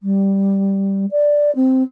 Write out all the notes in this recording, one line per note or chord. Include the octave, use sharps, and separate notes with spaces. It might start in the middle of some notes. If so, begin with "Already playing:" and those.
G3
D5
C4